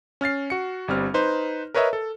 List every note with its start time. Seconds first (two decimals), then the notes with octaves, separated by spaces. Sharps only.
0.21 C#4 F6 A6 C7
0.50 F#4 C#7
0.88 G1 G3 C4 F6
1.14 D#4 B4 C5
1.74 A#4 B4 C#5 D#5 E5 A#5
1.93 A4